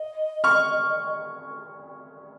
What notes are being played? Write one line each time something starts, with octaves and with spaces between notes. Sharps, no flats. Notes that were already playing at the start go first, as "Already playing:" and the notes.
Already playing: D#5
C#6 F6